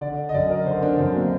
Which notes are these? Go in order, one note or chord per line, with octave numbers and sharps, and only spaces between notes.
D3 D5
D#5
F#2 D5
A#4
D3 C5
D4
F#2 C4
A#3